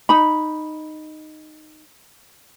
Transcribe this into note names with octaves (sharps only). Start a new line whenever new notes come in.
D#4 B5